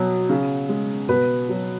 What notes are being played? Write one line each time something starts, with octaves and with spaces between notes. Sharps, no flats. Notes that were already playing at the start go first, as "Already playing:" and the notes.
Already playing: B2 F#3
C#3
G#3
B2 B4
F#3